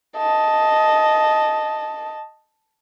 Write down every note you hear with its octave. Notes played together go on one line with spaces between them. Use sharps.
D#5 A5